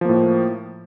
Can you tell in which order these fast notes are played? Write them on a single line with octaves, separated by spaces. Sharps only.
F3 A#3 A2